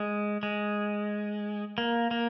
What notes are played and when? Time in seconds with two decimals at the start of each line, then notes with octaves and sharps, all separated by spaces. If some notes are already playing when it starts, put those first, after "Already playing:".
Already playing: G#3
0.43 G#3
1.78 A#3
2.11 A#3